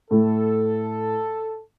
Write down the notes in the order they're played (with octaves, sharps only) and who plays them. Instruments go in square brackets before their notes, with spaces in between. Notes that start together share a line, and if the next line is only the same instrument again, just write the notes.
[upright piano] A2 [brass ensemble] A4